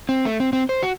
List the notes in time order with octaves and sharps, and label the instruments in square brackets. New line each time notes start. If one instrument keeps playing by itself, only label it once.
[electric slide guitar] C4
A3
C4
C4
C5
F#4